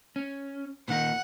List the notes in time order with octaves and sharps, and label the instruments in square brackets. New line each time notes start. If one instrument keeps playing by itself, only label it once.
[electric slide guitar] C#4
[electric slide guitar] A#2 D#3 D#4 [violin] F#5